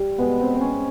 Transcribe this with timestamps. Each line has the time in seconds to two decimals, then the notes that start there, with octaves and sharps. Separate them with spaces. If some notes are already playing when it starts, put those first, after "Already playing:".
Already playing: G3
0.18 B2 G#3 B3
0.41 C4
0.55 C4
0.61 C#4